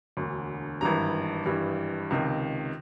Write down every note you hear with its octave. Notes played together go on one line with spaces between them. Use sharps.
E1 D2 D3
G#1 G2 E3 G3 A#5
G#1 G2 E3 G3
C#2 C3 D#3